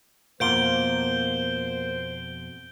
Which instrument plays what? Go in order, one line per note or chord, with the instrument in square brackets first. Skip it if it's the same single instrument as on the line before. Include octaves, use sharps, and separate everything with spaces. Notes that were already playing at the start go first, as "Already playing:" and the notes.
[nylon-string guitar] F2 B2 [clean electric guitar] A#3 F4 [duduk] C5 [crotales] G6 D7 G7